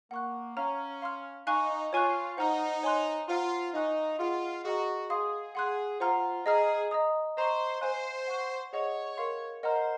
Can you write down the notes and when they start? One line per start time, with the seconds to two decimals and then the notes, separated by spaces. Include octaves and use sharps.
0.11 A#3 F#5 C#6 F#6
0.57 C#4 C#5 F5 A#5 F6
1.02 F5 C6 F6
1.47 D#4 F5 G#5 C#6 F#6
1.93 F4 C#5 G#5 C#6 F#6
2.37 D#4 C5 F#5 A#5 F6
2.83 C#5 G#5 C6 F#6
3.28 F4 C5 F#5 A#5 F6
3.74 D#4 F5 G#5 C#6 F#6
4.19 F4 G#4 D#5 F#5
4.64 F#4 G#4 D#5 F#5 A#5
5.09 G#4 F5 C6 D#6
5.55 G#4 F#5 C6 F#6
6.00 F4 C5 F#5 A#5 F6
6.46 G#4 D#5 A#5 F6
6.91 D#5 A#5 D#6
7.37 C5 D#5 A#5 C#6
7.81 C5 F5 G#5 C6 F#6
8.27 F#5 C#6 F#6
8.73 G#4 C#5 D#5 F#5
9.17 A#4 F5 C6
9.63 A#4 C5 D#5 F#5 A#5 F6